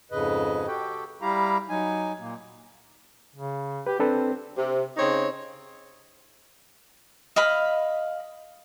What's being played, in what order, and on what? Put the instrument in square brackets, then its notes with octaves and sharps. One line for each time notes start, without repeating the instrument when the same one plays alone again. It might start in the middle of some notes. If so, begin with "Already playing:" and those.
[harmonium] F2 G#2 C#3 B4 D#5
F#4 G4 A4 G5
G3 E4 G4 F5 A#5
F#3 D#4 G#5
A#2 A#3
[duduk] C#3
[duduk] G4 [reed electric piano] B4
[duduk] C4 [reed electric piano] D4 A4 B4
[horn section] C3
C#3 C4 D#4 C#5
[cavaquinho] D#5 F5 B5